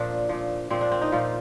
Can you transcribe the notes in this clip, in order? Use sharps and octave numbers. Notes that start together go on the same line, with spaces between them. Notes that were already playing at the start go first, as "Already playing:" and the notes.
Already playing: A#2 F3 D4
A#2 F3
A#2 F3 C4
D4
C4
D#4
A#2 F3 F4